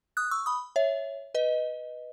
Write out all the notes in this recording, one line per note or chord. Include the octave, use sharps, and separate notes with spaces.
D#6 F#6
C#6 E6
B5 D#6
C#5 E5
B4 D#5